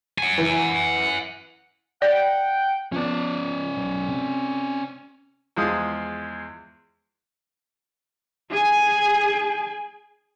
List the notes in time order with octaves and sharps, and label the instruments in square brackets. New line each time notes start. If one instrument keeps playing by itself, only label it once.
[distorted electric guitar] F#5 G#5
[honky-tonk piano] E3
[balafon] D5 [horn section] F#5 G5
[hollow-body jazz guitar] F3 B3 [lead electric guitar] C#4 D5
[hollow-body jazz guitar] B1
C3
[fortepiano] E2 F3 G#3 F5 D#6
[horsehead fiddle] G#4 G#5